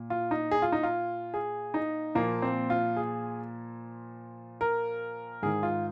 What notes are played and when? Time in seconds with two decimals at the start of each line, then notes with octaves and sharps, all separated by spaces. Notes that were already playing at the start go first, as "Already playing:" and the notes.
Already playing: A#2
0.10 F4
0.31 D#4
0.51 G#4
0.62 F4
0.72 D#4
0.83 F4
1.34 G#4
1.74 D#4
2.15 A#2 F3 A#3
2.42 C4
2.70 F4
2.97 G#4
4.61 A#4
5.43 G#2 D#3 G#4
5.63 F4